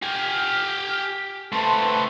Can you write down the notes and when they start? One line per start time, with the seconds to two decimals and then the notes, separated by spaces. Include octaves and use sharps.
0.03 G4 G#5 F6
1.53 A3 C4 B4 A5 C6